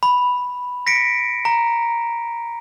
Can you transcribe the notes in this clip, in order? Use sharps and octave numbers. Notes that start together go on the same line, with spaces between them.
B5
A#6 B6 C#7 D7
A#5